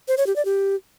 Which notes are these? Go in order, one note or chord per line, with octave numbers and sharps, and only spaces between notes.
C5
C#5
G4
D5
G4